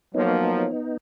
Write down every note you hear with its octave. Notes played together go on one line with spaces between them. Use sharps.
F3 F#3 A#3 B3 D#4 C#5